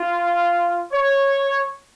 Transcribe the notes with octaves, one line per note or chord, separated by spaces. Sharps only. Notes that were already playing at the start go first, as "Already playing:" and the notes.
Already playing: F4
C#5